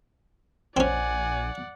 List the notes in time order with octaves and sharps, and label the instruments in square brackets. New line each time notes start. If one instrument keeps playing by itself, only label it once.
[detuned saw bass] A#1 [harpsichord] C4 C#4 [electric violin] D5 F#5 [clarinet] G#5